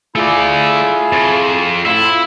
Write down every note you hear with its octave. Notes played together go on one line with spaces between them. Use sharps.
A3 E4 F4 G#4 D5
F2
A2 E4 F4